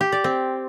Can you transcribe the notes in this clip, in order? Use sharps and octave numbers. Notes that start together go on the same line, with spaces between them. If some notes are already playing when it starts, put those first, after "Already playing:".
G4
D5
C4